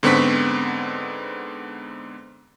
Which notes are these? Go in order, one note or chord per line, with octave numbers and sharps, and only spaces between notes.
G#2 D3 B3 C4 C#6 B6